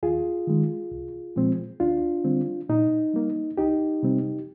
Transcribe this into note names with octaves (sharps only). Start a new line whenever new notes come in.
D#2 F4 G#4
D#3 G#3
C2
A#2 F3 G#3 C4
D2 D4 F4
D3 G3 C4
A#2 D#4
G3 A#3
C2 D#4 G4
C3 G3 C4